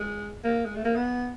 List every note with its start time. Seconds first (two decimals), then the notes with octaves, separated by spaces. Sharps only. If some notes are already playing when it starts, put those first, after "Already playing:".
Already playing: G#3
0.44 A#3
0.65 G#3
0.75 A3
0.85 A#3
0.96 B3